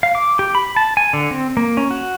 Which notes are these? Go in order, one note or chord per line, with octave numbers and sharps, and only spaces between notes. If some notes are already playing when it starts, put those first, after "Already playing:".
F5
D6
G4
B5
A5
G#5
D3
C4
A#3
C#4
F#4